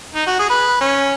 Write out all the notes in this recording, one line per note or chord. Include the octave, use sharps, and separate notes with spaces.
D#4
F#4
G#4
B4
C#4